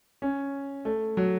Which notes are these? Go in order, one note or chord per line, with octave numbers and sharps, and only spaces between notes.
C#4
A3
F#3